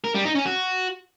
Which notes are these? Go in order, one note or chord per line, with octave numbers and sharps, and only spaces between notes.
A#4
G3
D#4
C#4
F#4